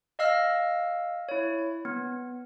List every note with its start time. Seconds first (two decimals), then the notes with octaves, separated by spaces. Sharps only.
0.19 D#5 F5 E6 F6 A#6
1.29 E4 C#5
1.85 B3